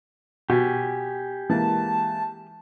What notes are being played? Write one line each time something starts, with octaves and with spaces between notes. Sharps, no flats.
B2 G4 G#5
E3 G#3 A#3 A5